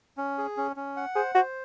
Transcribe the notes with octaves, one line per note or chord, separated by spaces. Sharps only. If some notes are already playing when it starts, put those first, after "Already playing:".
C#4
G#4
C#4
C#4
F#5
G#4 C5
F#4 C5